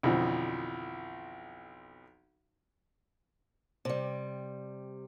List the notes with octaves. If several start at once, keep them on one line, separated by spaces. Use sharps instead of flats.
B1 F2 D3 E3 F3
C3 G3